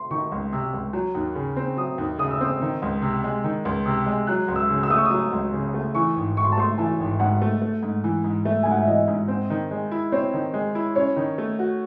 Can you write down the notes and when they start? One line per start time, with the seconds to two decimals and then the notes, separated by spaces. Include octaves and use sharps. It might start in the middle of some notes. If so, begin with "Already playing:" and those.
Already playing: C6
0.11 D#3 C#6
0.32 C#2
0.53 C3
0.74 C#2
0.93 F#3
1.15 D#2
1.35 C#3
1.57 C4
1.77 F#3 D#6
1.98 D#2
2.18 C#3 D#6
2.31 E6
2.41 C4 D#6
2.61 D#3
2.82 C#2
3.02 C3
3.24 G#3
3.44 D#3
3.65 C#2
3.86 C3
4.06 G#3
4.27 F#3 F#6
4.48 C#2
4.56 E6
4.70 C#3
4.83 E6
4.90 A3 D#6
4.98 C#6
5.05 D#6
5.11 F#3
5.33 C#2
5.53 C#3
5.74 A3
5.95 E3 C#6
6.16 G#1
6.37 G#2 C#6
6.44 C6
6.52 A5
6.57 A3 C6
6.78 E3 A5
7.00 G#1
7.20 G#2 F#5
7.42 A3
7.62 A3
7.83 G#2
8.04 E3
8.24 G#2
8.45 A3 E5
8.63 G#2 G#5
8.71 F#5
8.79 E5
8.87 E3 D#5
9.08 G#2
9.28 C4
9.50 D#3
9.71 G#3
9.92 E4
10.12 C4 C#5
10.34 D#3
10.54 G#3
10.75 E4
10.95 C#4 C#5
11.17 D#3
11.38 A3
11.59 F#4